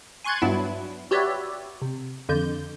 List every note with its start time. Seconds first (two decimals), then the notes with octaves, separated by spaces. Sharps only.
0.24 G#5 C6 C#6 F#6 G#6 A6
0.42 G2 F#3 B3 D4 E4
1.11 F#4 G4 B4 C#5 D5 E5
1.82 C3
2.29 F2 D3 G6